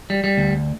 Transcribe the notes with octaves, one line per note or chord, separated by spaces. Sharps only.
G3
G3
D2